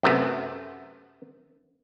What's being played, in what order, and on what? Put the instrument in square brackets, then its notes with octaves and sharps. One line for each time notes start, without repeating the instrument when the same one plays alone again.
[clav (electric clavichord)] F#2 C3 A3 B3